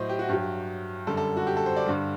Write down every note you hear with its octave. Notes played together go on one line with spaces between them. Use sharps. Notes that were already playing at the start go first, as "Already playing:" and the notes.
Already playing: A2 F#3 C5 D#5
G4
F#4
G2 F#3 G4
F#2 D3 G3 A4
A4
F#4
G4
A4
C5
D5
G2 D3 G3